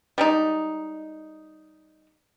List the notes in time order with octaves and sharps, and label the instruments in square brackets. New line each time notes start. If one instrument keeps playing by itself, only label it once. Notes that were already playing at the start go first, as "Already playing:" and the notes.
[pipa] G3 G#3 D#4